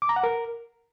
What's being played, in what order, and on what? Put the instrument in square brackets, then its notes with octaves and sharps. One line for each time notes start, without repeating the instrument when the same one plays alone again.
[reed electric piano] D6
A#5
F#5
A#4